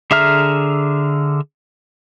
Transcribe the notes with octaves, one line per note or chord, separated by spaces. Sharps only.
D3 G#4 E5 A#5 F6